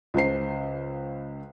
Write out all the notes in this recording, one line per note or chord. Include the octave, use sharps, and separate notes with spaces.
C#2 C#3 C5 C7